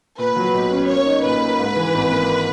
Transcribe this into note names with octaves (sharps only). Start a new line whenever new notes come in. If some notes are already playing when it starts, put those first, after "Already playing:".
A#2 B4
F#3
B1
C#4
A#3 C#5
D#4
A#2 B4
A#4
G#2
E3
G#1
A#3